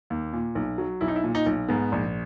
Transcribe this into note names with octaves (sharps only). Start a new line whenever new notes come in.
D#2
A#2
B1
F#3
B1 E4
D#4
E4
A#2
D#4
B1
G#2 B3
A#1